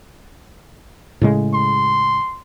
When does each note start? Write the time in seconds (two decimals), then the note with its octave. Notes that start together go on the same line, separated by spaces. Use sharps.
1.21 A2 C#3 G#3
1.54 C6